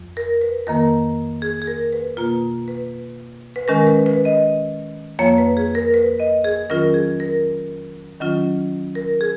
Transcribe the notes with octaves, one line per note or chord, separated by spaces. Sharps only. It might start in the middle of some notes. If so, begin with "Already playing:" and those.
Already playing: F2 F3
A#4
B4
F2 D#3 A#3 A#4
G#4
G#4
A#4
B4
B2 A#3 F4
B4
B4
D#3 G#3 C#4 A#4
B4
B4
D#5
F2 F3 A#3 C#5
B4
G#4
A#4
B4
D#5
G#4
D#3 F#3 C#4 F4 A#4
G#4
A#4
D#3 F#3 C#4 F4
A#4
G#4